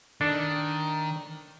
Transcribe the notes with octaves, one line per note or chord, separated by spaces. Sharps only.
D#3 D4 A4